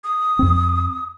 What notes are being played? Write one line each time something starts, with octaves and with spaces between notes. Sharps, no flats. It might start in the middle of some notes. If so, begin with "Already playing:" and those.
D#6
F2 C4